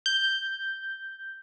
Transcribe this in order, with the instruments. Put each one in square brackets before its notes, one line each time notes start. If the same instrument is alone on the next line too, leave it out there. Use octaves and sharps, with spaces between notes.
[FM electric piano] G6